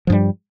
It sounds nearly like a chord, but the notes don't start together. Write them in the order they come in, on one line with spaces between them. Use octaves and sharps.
F3 G2 G3